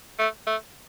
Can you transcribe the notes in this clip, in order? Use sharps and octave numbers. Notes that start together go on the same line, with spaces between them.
A3
A3